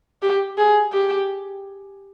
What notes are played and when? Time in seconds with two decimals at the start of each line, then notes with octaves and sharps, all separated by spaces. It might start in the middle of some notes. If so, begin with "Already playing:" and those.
0.22 G4
0.58 G#4
0.93 G4